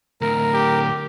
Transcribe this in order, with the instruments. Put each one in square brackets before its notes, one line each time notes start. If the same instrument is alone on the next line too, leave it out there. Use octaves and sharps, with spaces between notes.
[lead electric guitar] D2 A2 [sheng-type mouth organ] A#4
[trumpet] G4